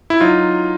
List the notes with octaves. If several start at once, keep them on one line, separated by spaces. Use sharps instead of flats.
E4
F#3 D#4 F4